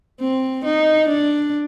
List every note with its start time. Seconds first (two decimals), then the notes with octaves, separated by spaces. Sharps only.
0.21 C4
0.65 D#4
1.08 D4